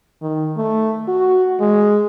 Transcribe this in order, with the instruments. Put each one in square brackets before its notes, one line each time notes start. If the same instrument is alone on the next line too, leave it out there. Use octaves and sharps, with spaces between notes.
[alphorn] D#3
A3
F#4
G#3